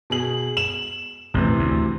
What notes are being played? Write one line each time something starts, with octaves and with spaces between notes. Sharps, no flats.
B2 G#4 F#7
E7 F#7
A1 F2 C3 E3
D2